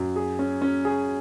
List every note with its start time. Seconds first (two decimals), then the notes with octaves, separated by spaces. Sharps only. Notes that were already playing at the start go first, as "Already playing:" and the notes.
Already playing: F#2
0.16 G#4
0.39 C#4
0.62 C#4
0.85 G#4